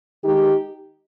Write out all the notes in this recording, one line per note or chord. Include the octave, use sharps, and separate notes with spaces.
D#3 G#3 D#4 G4